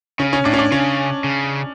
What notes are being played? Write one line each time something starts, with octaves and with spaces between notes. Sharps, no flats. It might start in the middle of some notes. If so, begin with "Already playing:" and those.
C#3 C#4
C#4
A2 D4
C#4
D4
C#3 C#4
C#3